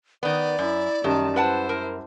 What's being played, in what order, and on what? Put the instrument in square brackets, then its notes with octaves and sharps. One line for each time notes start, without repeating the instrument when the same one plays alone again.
[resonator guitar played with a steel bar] D#3 B3 [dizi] D5
[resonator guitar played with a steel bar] F#2 [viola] E4
[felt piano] F#2 G3 [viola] D#3 A5 [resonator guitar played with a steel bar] F#3
[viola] E4 C5 [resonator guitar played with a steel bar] B4 F#5 A5
[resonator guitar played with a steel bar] A#4